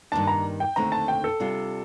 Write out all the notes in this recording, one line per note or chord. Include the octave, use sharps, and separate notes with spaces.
G2 D#3 A#3 D4 A5
A#5
G5
D#2 D3 A3 C4 A#5
A5
G5
A4
C3 G3 D4 F4